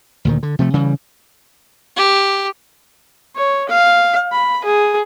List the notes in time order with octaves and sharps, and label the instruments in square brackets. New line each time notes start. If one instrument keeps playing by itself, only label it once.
[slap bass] D2 A#2 D#3
D3
C3 F3 A3
C#3 E3 G3
[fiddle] G4
[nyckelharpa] C#5
F5
B5
G#4